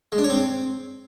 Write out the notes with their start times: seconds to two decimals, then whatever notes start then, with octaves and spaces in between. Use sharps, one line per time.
0.12 G#3
0.18 D4
0.24 C#5
0.30 C4